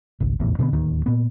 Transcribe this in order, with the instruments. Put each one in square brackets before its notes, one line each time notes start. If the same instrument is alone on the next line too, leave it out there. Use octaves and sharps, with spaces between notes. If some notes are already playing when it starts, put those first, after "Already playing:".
[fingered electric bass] G#1 C#2
F1 A#1 E2 A2
B2 D3 G3 B3
D1 D#2 D#3
A#2 B3